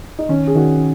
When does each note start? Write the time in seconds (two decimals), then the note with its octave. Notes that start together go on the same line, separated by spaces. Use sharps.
0.19 D#4
0.29 D#3 C#4
0.47 G#4
0.55 D#3 F#4